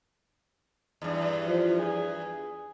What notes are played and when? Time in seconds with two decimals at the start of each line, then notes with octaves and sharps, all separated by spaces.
1.02 E2 G2
1.47 F3
1.79 G#4